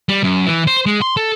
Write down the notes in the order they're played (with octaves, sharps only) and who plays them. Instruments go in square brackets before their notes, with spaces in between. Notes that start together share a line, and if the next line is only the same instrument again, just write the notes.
[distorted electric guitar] G3
F#2
E3
C5
G#3
C6
A4